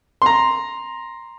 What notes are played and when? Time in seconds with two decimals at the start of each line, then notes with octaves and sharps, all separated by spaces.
0.22 A#5 C6